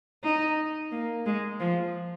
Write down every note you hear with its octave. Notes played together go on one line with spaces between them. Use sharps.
D#4
A#3
G#3
F3